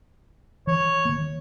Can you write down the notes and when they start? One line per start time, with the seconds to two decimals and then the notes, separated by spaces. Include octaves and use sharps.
0.67 E3 C#5
1.05 D#3 A#3